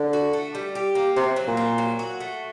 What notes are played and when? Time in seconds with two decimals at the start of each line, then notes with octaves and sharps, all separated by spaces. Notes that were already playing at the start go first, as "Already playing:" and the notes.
Already playing: D3
0.13 F#4
0.33 A3
0.55 G3
0.75 G4
0.95 A#3
1.16 C3 F#3
1.36 F#3
1.48 A#2
1.57 C4
1.78 F#3
1.99 F#4
2.20 A3